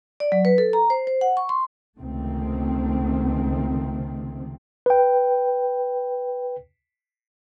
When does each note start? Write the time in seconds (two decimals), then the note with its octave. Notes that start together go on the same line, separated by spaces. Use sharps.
0.20 D5
0.32 F#3
0.45 B4
0.58 A4
0.73 A#5
0.90 C5
1.07 C5
1.21 F#5
1.37 C#6
1.49 C6
1.99 C#2 C3 D#3 A3 C4
4.86 B4 G5